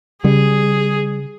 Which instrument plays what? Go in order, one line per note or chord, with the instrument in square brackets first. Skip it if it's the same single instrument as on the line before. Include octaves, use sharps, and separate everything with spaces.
[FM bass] C#3 [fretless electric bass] G3 [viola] G#4